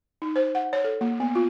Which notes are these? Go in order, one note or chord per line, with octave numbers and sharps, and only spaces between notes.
D#4
C5
F#5
C#5
A4
A#3
B3
F4